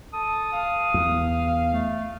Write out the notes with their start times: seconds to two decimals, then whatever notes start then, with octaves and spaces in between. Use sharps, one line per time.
0.13 A4 D#6
0.53 F5
0.94 E2
1.72 A3